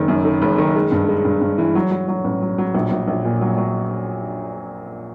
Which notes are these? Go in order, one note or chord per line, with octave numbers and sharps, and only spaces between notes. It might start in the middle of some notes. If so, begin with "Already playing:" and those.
Already playing: F#1 D#3
F#2
D#3
F#1
D#3
G#3
G2
G#3
G2
G2
E3
F#3
F#3
F#3
A1
F#3
F#3
A#1
A#1
A#1
A#2
F#3
F#3